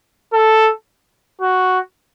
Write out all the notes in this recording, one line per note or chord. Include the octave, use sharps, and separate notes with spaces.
A4
F#4